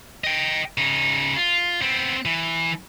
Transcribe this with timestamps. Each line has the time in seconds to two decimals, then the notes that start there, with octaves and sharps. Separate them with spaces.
0.24 D#5 G5
0.78 C#3 D#4
1.36 F4
1.82 B3 C4
2.25 E3